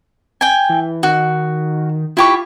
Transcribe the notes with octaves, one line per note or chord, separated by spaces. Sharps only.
G5 G#5
E3
D#3 F#4
E4 F4 G4 C#6